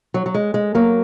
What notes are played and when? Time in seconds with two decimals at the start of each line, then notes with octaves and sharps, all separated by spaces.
0.14 F#3
0.26 F#3
0.34 G#3
0.54 G#3
0.75 F#3 A#3